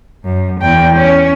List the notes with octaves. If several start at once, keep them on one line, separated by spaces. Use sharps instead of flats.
F#2
E2 G5
C#4